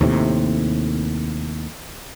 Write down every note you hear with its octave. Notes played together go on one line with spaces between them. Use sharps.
D#2 A2 C3